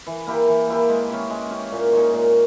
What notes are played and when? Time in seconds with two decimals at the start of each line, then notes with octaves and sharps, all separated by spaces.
0.07 E3
0.27 A#3 E4 G4
0.48 E3
0.68 A#3 E4 G4
0.89 G#3
1.10 C#4 G4
1.30 G#3
1.51 C#4 G4
1.72 A#2
1.92 G#3 D#4
2.13 A#2